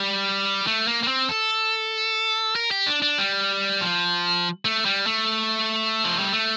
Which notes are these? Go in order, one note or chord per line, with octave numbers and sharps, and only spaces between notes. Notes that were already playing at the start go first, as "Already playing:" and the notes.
Already playing: G3
A3
A#3
A#3
C4
A4
A#4
G4
D4
D4
G3
F3
A3
G3
A3
F3
G3
A3